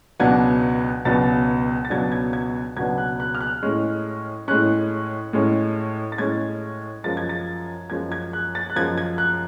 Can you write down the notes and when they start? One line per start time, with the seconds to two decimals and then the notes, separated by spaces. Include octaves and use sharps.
0.19 C#2 B2 F#3 B3 D4 G#6
1.05 C#2 B2 F#3 B3 D4 A6
1.85 A6
1.90 C#2 B2 F#3 B3 D4 G#6
2.12 G#6
2.33 G#6
2.77 C#2 B2 F#3 B3 D4 G#6
2.98 F#6
3.20 F#6
3.35 F6
3.41 F#6
3.63 A2 G#3 C#4
4.48 A2 G#3 C#4 F#6
5.33 A2 G#3 C#4
6.12 A6
6.18 A2 G#3 C#4 G#6
7.04 F#2 F3 G#3 A6
7.17 G#6
7.29 A6
7.90 F#2 F3 G#3 G#6
8.12 G#6
8.33 F#6
8.55 A6
8.70 F#6
8.75 F#2 F3 G#3 G#6
8.98 G#6
9.18 F#6